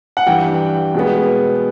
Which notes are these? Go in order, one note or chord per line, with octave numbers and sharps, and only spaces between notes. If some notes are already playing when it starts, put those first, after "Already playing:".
F#5
G2 E3 G3 G5
B2 G#3 B3